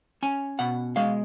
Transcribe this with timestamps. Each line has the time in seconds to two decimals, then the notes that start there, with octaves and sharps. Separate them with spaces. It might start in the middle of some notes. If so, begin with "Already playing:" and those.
0.23 C#4 G#5
0.59 B2 F#5
0.96 G#3 F5